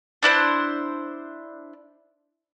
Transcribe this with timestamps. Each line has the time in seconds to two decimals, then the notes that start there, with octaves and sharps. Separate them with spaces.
0.23 D4 E4 B4 C5